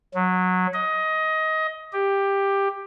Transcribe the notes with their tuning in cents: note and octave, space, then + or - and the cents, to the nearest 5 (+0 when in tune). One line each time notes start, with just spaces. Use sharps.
F#3 -15
D#5 +20
G4 +10